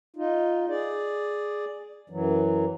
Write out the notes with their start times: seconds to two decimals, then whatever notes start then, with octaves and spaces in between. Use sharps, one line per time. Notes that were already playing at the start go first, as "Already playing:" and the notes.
0.16 D#4 F4
0.69 G#4 D5
2.10 F#2 E3 F#3